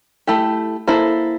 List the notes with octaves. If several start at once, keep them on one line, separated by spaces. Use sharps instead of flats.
A3 E4 G4
A#3 E4 A4 C5